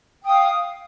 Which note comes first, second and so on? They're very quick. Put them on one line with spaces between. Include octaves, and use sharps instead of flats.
G5 D#6 F5